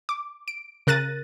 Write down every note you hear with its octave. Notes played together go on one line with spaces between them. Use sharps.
D6
D7
C#3 A#4 F#6 A6 A#6 D#7